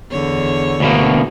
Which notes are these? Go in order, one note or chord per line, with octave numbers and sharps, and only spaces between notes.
E2 D3 C#5
D2 B2 A#3